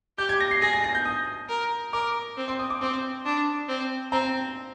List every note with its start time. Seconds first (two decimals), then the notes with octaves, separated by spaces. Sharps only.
0.18 G4 G6
0.29 G#6
0.41 A#6
0.51 C7
0.61 G#4 A#6
0.73 A#6
0.84 A#6
0.95 G6
1.05 D#6
1.49 A#4
1.93 A#4 D6
2.37 C4
2.48 C6
2.59 D#6
2.70 D6
2.81 C4 C6
3.25 D4
3.68 C4
4.12 C4 A#5